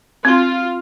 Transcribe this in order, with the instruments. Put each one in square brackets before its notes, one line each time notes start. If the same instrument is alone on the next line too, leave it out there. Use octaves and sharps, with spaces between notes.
[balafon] C4 C6 [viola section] F4